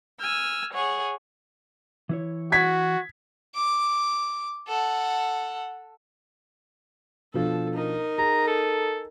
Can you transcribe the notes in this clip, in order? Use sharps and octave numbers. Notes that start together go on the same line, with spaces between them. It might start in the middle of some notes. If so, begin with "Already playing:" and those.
G#5 E6 F6
G#4 C#5 F#5
E3 E4 C#5
F#4 G#6 B6
D6
A4 F#5
B2 F3 D4 A4
D#4 A#4
G#4 A#5
A4